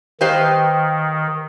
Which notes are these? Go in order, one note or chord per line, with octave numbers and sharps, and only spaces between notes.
D#3 G4 B4 C5 D#5 F5